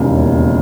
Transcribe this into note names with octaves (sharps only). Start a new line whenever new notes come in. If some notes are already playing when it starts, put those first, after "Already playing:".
Already playing: E1 D#2 C#3